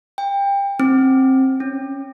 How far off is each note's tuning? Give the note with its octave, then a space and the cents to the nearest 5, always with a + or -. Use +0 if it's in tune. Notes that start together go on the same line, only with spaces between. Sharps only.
G5 +25
C4 +20
C#4 +0